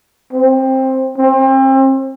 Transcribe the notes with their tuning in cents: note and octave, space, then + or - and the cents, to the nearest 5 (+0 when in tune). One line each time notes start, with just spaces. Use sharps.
C4 +15
C4 +35